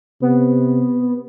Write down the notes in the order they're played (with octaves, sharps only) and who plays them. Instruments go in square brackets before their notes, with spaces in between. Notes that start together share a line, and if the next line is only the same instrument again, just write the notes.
[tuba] C3 [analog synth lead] B3